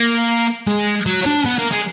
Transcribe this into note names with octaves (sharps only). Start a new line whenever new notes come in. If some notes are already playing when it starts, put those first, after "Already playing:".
Already playing: A#3
G#3
F#3
D4
B3
A#3
G#3